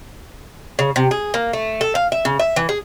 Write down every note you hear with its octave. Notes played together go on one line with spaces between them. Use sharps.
C#3
C3
G#4
A#3
A3
A4
F5
E5
C#3
E5
E3
G#4